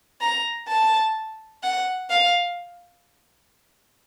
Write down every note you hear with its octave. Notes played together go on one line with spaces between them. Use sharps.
A#5
A5
F#5
F5